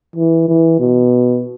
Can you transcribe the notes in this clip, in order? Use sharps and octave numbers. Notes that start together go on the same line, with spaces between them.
E3
E3
B2